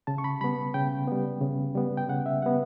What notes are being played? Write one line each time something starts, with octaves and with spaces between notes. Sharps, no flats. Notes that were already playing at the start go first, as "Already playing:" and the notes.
C#3 A5
C#6
B5
G3 B3 B5
C#3 G5
G3 B3
C#3
G3 B3
G5
C#3 F#5
E5
G3 B3 F#5